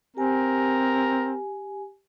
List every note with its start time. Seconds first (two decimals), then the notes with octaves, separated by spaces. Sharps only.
0.17 C4 G4 A#4 G#5